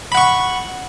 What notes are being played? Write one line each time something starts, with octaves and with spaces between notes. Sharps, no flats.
F#5 B5 C#6